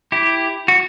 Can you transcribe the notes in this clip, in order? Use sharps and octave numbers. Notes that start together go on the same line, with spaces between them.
E4 G4
F#4